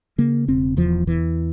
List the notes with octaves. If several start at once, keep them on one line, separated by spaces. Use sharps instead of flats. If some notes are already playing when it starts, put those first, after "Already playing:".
C#3 A#3
E1 C4
E2 F3
E2 E3